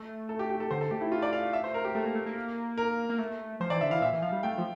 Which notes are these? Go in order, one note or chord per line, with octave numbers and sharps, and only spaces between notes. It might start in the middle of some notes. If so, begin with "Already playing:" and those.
Already playing: A3
A4
G4
G4
A4
D3 C5
A4
A3 G4
E4
F4
D5
F5
E5
C5
A#4
G4
A3 A4
A#3
A3
A#3
A#4
A#3
A3
F3 C5
E3 D5
D3 E5
E3 F5
A#2 E5
E3
F3 F5
G3
A3 G5
F3